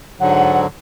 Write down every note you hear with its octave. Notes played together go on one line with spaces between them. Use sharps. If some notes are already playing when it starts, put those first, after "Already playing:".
G#2 D3 F#3 F#5